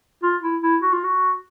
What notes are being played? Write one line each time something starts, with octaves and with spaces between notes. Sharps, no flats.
F4
E4
E4
F#4
F4
F#4